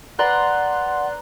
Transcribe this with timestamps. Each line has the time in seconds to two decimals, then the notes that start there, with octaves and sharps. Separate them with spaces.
0.19 B4 D5 F#5 A#5 C6 F#6